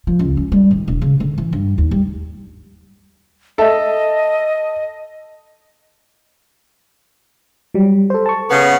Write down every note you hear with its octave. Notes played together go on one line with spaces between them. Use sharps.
F3
C#2
C#4
G3
D#3
E1
C#3
D3
E3
G2
D#2
G3
A4 D#5 E5
F#3 G3
A4 C5
A5 C#6
C#3 B3